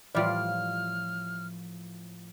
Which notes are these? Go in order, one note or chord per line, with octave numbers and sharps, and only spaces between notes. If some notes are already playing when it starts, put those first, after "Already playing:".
A2 E3 F3 G3 F4 D5 F6